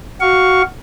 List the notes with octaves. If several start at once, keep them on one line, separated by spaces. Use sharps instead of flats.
F#4 F5 C#6